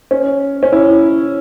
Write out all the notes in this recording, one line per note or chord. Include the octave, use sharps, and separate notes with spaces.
C#4
C#4
E4